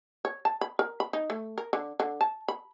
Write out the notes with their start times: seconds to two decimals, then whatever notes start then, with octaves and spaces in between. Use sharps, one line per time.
0.25 C#5
0.45 A5
0.61 B5
0.79 A#4
1.00 B5
1.13 D#4
1.30 A3
1.58 A#4
1.73 D3
2.00 D3
2.21 A5
2.48 B5